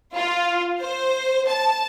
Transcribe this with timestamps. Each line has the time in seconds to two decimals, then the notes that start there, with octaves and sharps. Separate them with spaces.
0.13 F4
0.80 C5
1.47 A5